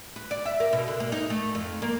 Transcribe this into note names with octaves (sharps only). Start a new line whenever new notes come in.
B4
D5
E5
A#4
B2
D3
A#3
D#4
A3
F2
A#3